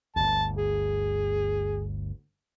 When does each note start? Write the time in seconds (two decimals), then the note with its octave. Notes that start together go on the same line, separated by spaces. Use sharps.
0.16 G1 D2 A5
0.58 G#4